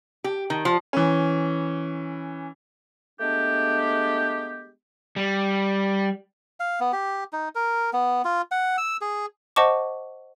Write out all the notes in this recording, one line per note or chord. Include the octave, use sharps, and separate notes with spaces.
G4
D#3
F3
E3 C#4
G#3 A3 B3 D4 G4
G3
F5
B3
G4
D#4
A#4
B3
F4
F#5
E6
G#4
C5 D#5 F#5 A5 C#6 D6